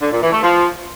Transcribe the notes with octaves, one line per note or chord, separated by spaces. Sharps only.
D3
A#2
E3
A3
F3